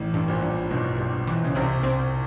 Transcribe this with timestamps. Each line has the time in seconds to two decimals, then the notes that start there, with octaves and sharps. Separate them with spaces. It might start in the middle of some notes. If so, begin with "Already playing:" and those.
Already playing: A1 A2 E3
0.14 G2
0.28 A#1 A#2
0.42 G2
0.70 B1 G2 B2
0.98 G2
1.27 E3
1.44 C#3
1.55 C2 C3 C4
1.83 C4